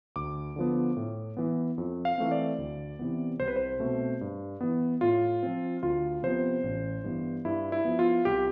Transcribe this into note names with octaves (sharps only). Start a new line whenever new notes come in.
D2 D6
D3 F3 B3
A2
E3 B3
F2
F5
E3 A3 C4
D5
D2
C3 E3 B3
C2 C5
B4
C5
B2 A3 C4
G2
E3 B3
A2 F4
F3 C4
D2 F4
C3 F3 B3 C5
A1
G2 E3 B3
G2 E4
E4
F3 B3
F4
C2 G4